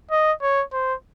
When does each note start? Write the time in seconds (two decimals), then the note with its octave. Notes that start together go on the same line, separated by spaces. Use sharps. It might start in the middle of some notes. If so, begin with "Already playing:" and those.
0.11 D#5
0.42 C#5
0.73 C5